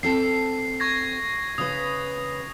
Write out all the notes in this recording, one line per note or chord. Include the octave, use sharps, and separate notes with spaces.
C4 A4 A5 C7
C#6 G#6 A#6
C#3 B4 D#6